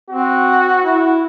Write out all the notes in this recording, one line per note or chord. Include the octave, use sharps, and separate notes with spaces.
C4 F#4
E4